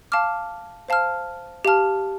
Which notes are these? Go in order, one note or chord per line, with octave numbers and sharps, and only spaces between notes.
F5 A5 D6 F6
C5 F5 A5 F6
G4 F5 A5 F6